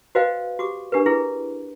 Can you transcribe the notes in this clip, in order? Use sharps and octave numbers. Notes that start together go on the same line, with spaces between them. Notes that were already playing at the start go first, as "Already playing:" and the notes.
F#4 B4 C5 D#5 F5 G5
F#4 G4 D6
D4 G4 A#4 B4
E4 G#4 B4